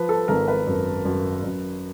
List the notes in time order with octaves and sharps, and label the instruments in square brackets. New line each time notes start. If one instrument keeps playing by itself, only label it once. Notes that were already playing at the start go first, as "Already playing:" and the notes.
Already playing: [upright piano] F3 B4
A4
G#1 A#4
B4
F#2
F#2
F#2